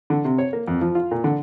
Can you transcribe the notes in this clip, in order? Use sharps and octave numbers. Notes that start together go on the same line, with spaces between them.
D3
C3
C#5
A#3
F2
F3
F4
A#2
D3